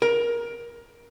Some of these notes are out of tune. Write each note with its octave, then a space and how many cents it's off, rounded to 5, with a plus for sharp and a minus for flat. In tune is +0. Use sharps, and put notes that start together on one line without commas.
A#4 +20